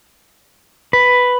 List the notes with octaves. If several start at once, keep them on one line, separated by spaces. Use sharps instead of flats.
B4